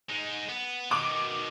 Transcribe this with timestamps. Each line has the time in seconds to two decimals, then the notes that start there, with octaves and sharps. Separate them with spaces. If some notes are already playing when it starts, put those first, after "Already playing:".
0.10 G#3 D#4
0.49 B3
0.91 B2 D#3 D6